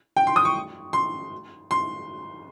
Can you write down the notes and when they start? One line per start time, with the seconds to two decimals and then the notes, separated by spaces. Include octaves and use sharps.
0.17 G5
0.27 C6
0.36 D#6
0.45 C#6
0.93 C6
1.71 C6